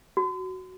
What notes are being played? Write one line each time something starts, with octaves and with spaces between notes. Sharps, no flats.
F#4